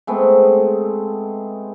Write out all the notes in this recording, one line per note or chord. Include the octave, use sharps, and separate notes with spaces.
G#3 A3 B3 C4